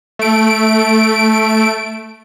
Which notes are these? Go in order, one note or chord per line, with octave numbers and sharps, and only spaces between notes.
A3 D7